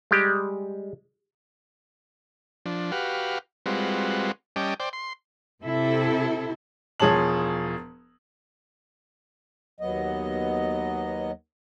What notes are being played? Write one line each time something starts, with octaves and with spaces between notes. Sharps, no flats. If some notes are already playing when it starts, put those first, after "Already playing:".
G3 G#3 G4
F3 D4
F#4 G4 B4 F5
G3 G#3 C4 F4 F#4 B4
G3 C#4 D#5 G5 A5 D6
C5 D5 G5
C6
C3 E4 A4
E1 F3 G#4 C#5 A5 F#7
D#2 F#3 B3 D#5